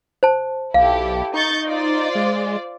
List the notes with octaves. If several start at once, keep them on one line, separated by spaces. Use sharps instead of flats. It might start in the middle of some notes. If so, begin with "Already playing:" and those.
C5 A5
B1 E4 G4 A4 F5
D#4 C#6 G6 A6
F4 C5 D5
G#3